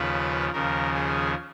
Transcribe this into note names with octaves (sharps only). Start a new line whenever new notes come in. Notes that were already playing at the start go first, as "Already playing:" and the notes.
Already playing: D#2 C#3 F3 B4
D#2 C#3 F3 A#4
G#4